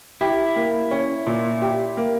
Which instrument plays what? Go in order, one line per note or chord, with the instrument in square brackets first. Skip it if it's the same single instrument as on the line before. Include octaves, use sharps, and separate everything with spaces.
[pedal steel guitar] E4 [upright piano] G4
[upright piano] A#3
C#4
A#2
G4
A#3